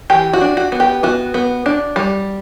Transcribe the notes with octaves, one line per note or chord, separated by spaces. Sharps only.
E3 G4
F#4
D4
F#4
B3
G4
B3 F#4
B3
D4
G3